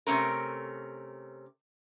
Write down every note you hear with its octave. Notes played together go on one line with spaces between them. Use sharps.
C3 A3 C#4 A#4